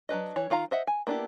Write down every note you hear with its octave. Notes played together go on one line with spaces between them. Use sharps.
F#3 D4 B4 D#5
E3 C#5
D#3 F4 F5 A#5
C5 D#5 E5 F#5
G#5
A#3 B3 D4 E4 G4